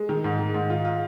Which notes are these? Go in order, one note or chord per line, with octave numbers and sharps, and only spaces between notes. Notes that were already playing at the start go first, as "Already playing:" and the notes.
Already playing: G#3
D#3
G#2
D#3
G#2
F4
F4